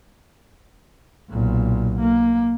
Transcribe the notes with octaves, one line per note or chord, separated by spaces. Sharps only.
B1 A#2
A#3